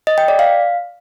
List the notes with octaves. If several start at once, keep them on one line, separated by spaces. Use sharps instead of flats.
D#5
G5
D5
F5